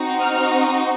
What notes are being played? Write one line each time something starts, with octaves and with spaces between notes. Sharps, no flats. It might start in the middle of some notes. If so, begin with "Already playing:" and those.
Already playing: C4 D#4 F#4
F6